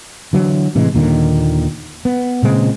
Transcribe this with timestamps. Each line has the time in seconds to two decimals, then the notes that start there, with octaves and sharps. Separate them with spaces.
0.33 D3 E3 F#3
0.75 A2 C3 E3 G#3
0.95 D#2 A#2 D3 D#3
2.05 B3
2.43 A#2 C#3 G#3 C4